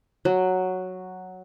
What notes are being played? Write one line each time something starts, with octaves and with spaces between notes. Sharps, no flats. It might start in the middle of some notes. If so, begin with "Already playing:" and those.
F#3